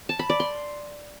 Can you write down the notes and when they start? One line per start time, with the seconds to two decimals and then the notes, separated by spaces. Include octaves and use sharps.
0.09 A5
0.19 B5
0.30 D5
0.40 C6